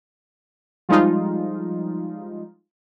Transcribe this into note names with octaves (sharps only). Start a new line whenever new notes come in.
F3 G3 G#3 D#4 F4